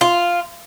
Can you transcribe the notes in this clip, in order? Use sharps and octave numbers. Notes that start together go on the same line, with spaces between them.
F4